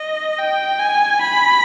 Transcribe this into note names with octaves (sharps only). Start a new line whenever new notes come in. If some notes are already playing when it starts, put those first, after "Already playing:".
Already playing: D#5
G5
G#5
B5